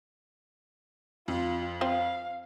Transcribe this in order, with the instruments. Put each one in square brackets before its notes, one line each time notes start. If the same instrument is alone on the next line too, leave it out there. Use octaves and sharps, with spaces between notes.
[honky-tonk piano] F2 [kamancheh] F4
[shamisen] C4 F4 C5 [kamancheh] F5